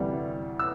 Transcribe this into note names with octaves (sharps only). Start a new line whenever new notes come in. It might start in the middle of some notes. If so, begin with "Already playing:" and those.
Already playing: D2 C3 E3 G3
E6